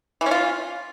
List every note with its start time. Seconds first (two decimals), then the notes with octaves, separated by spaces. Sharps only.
0.21 E3
0.26 C#4
0.31 F4